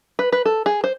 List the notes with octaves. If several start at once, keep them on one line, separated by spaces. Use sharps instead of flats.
B4
B4
A4
G#4
C5